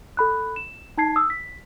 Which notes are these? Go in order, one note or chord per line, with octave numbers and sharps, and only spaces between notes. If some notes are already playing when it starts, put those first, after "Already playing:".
A4 B5 F#6
E7
D#4 A5 G#6 C7
D#6 E6
B6